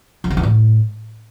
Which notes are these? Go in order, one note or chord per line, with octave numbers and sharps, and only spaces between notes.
F2
D#3
E2
A2